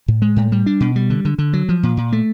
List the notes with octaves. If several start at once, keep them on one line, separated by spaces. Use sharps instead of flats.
A2
G#3
A2
G3
D4
B2
G3
D3
D3
D3
F#3
F3
A#2
A#2
A3